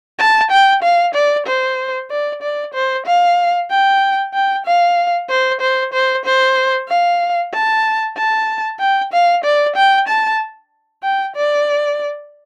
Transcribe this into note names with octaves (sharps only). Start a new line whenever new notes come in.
A5
G5
F5
D5
C5
D5
D5
C5
F5
G5
G5
F5
C5
C5
C5
C5
F5
A5
A5
G5
F5
D5
G5
A5
G5
D5